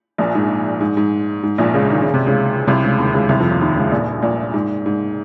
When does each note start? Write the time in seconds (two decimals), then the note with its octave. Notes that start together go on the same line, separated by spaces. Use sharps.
0.18 A#1 A#2
0.35 G#2
0.80 G#2
0.97 G#2
1.43 G#2
1.58 A#1 A#2
1.74 C#2 C#3
1.90 D#3
2.01 C#3
2.14 C3
2.27 C#2 C#3
2.67 C2 C3
2.83 C#2 C#3
2.98 D#2 D#3
3.13 C#2 C#3
3.29 C2 C3
3.39 F2 F3
3.50 D#2 D#3
3.61 D#2 D#3
3.76 C#2 C#3
3.92 A#1 A#2
4.22 A#1 A#2
4.54 G#2
4.86 G#2